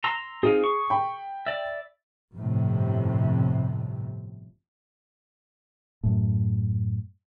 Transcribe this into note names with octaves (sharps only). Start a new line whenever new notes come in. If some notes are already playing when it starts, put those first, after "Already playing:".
A#5 C6 E6
C4 D#4 F4 G#4
C#6
G5 B5
D5 E5
G1 F2 A2 C3
F#2 A2